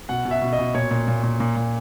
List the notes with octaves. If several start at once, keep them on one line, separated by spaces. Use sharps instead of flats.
B2 F#5
B2
E5
B2
D#5
B2
A#2 C#5
A#2
A#2
A#2
A#2
A#2